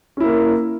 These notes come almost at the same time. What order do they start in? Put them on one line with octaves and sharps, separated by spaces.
C#4 E4 A#3 A#4